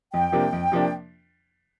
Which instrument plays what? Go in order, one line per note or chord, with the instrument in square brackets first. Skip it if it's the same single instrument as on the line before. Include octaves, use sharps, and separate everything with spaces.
[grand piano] F2 [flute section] G5
[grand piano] C3 F3 A#3 D4
F2
C3 F3 A#3 D4